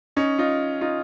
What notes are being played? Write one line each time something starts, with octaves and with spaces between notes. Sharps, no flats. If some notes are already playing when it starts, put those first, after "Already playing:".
C#4 D#4
D#4 F4
D#4 F4